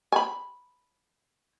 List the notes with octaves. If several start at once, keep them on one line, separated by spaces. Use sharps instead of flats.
G#5 B5